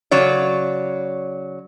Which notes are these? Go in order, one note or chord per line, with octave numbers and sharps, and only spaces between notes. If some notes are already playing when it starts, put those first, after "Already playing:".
C#3 F#3 C#5 D5